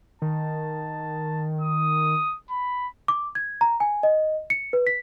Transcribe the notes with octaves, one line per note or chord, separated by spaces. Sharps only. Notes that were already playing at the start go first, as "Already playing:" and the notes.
D#3 A5
D#6
B5
D6
G#6
A#5
G#5
D#5
C#7
B4
B6